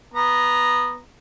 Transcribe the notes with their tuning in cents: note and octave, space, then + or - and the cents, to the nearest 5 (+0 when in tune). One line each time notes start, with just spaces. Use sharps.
B3 -5 A#5 +0